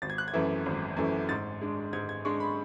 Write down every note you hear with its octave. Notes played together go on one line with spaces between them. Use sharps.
G#1 A6
G#6
F#6
G#6
F#2 E3 A3
G#1
F#2 E3 A3
G#2 A6
G#3 D4
G#2 G#6
G#6
G#3 D4 C#6
B5